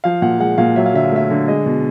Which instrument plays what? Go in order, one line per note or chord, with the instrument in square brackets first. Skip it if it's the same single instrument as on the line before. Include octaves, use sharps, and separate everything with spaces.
[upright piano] F3 F5
A#2 F#5
G#3 F#5
A#2 F5
F#3 E5
F5
D3 E5
F5
A3 E5
D3
G#3 D#5
B2